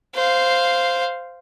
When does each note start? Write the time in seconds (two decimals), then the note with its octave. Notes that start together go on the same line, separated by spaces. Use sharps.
0.15 C5 F5